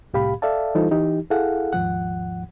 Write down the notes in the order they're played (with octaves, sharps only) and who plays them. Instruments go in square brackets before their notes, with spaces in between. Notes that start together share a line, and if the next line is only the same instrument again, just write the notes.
[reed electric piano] C2 A2 G4 F5 B5
A4 D5 E5 F5 A5
E3 G3 D#4 F4 A4 C5
E3 D#4 G4
E4 G#4 A4 F5 F#5
D#2 G#2 F3 F#5